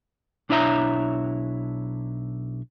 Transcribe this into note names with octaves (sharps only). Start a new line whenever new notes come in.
B1 D4 E4 C#5 E5 A#5